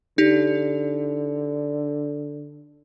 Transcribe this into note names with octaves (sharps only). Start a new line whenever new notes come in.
D3 D#4 G4